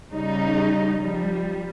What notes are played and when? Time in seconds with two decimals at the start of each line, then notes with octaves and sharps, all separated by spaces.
0.13 C#3 G3 D#4
0.99 F3 G3